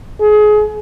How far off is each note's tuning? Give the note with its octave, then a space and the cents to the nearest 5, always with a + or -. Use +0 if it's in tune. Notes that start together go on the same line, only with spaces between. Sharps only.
G#4 +25